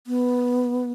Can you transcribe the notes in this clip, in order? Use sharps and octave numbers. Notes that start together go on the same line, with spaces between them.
B3